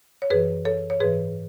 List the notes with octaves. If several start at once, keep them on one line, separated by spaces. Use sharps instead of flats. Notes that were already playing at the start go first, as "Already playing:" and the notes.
C#5
F#2 E3 G#4 B4
A4 C#5
C#5
G#2 E3 G#4 B4